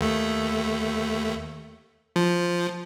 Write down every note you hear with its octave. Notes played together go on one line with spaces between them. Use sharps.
D#2 A3
F3